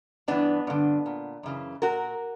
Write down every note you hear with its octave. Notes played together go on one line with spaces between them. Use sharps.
G2 E3 B3 D4
G2 D3
A#2
F#2 C#3 E3
A#2 F#4 A#4